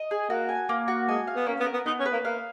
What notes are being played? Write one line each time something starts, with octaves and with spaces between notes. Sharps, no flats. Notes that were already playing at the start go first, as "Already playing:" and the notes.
Already playing: D#5
G#4
A#3 F#4
G#5
A#3
F#4
G#3 G#5
F5
B3
A#3 C#4
B3
A#4
B3
B3 D#4
C#4
B4
A#3
A#3 F5